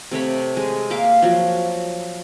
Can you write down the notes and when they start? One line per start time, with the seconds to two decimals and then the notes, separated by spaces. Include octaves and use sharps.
0.11 C3 A3 C#5 B5
0.57 G#3
0.90 A#3 E5 F5 D6
1.22 F3 F#3